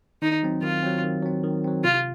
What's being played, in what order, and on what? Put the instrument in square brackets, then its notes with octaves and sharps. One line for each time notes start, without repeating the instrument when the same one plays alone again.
[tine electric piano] D#3 [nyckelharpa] D#4
[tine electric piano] F#3 C4
[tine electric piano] D#3 [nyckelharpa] F4
[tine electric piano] F#3 C4
D#3
F#3 C4
D#3
F#3 C4
[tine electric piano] C3 [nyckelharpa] F4